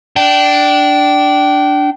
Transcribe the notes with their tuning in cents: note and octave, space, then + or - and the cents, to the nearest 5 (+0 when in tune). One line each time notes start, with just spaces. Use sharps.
D4 +0 G5 -25